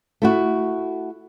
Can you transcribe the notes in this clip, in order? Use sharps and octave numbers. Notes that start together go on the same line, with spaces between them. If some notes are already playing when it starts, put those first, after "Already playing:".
A3 E4 F#4